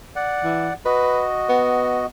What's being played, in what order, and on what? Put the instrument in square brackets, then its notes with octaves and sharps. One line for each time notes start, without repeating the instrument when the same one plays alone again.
[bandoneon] D5 F#5
[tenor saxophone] E3
[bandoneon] F#4 D#5 [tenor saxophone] B4
[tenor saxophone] B3